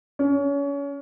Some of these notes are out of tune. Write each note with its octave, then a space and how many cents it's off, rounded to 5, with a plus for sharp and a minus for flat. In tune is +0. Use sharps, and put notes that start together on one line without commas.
C#4 +30